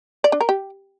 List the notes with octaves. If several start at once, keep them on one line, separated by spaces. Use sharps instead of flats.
D5
D4
A#4
G4